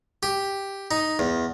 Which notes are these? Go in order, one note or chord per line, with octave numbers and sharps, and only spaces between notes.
G4
D#4
E2